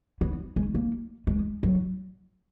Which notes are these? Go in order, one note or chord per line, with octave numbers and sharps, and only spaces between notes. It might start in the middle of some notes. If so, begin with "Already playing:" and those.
B3
G#3
A#3
G#3
F#3